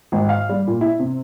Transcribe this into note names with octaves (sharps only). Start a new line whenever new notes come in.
G#1
F5
G3
A#2
E4
C3